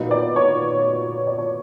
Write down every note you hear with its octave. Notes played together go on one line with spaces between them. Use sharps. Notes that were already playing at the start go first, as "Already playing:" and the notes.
Already playing: A#2 F#3 B3 D#4
D5
C#5
D5
C#5